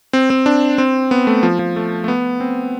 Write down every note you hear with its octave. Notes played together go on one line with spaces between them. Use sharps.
C4
C4
D4
C4
B3
A3
F3
F3
A3
A3
B3
C4